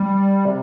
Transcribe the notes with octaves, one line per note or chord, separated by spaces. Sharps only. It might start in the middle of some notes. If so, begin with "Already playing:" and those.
Already playing: G3
C3